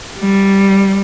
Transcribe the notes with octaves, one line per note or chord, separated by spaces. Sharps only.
G3